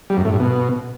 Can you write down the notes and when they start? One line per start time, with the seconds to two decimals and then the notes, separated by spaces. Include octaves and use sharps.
0.10 G3
0.17 F#2
0.25 A2
0.32 G2
0.40 B2